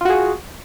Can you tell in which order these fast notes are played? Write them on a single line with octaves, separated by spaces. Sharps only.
F4 F#4 G#4